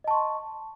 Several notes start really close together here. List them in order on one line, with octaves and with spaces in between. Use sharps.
D#5 A5 C#6 C6